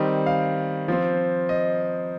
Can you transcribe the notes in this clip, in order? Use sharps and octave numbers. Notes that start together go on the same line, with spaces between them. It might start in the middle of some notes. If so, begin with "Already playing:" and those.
Already playing: D#3 G3 C4 D#5
F5
F3 C4
D#5